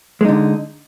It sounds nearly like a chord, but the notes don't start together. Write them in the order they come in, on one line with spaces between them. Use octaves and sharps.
G#3 D#4 D3